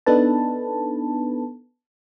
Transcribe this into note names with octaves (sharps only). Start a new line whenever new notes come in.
B3 D4 D#4 A4 B4 A5